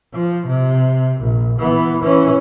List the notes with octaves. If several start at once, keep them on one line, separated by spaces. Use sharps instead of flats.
F3
C3
A#1
E3 B3
E3 C#4